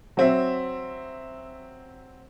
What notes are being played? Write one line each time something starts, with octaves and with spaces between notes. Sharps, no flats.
F#3 C4 E5